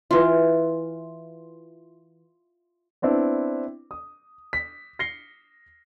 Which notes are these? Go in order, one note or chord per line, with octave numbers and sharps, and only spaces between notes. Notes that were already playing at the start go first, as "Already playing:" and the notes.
E3 F4
B3 C4 D4 E4
D#6
B6
A#6 C7 C#7 G7